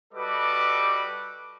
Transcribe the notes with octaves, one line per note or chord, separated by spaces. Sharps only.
G3 F#4 A4 B4 D#5 D6